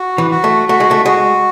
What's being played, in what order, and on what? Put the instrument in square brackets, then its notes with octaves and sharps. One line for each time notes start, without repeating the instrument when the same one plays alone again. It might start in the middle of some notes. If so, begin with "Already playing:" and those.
Already playing: [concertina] F#4
[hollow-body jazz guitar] E3
[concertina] F#4
[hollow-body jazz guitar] A3
[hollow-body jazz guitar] A3 [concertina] F#4
[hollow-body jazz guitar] G#3
A3
[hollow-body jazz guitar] G#3 [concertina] F#4